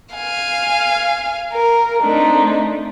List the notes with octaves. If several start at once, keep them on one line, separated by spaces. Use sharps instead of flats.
F5 G#5
A#4
A3 C4 D4 D#4